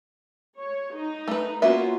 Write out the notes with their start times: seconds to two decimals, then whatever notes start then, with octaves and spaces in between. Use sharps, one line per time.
0.59 C#5
0.96 D#4
1.28 A3 B4
1.62 A#3 B3 C#4 F4 F#4 E5